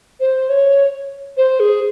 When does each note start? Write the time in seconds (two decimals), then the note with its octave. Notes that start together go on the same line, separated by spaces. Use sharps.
0.20 C5
0.49 C#5
1.37 C5
1.60 G#4